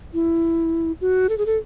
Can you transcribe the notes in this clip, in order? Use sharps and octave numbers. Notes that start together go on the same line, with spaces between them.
E4
F#4
A4
G#4
A4